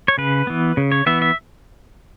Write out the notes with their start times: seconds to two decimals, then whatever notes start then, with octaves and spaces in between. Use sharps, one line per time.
0.08 C#5
0.18 C#3 B4
0.47 E3 B3
0.77 C#3
0.92 C#5
1.06 E3 B3 E5
1.22 E5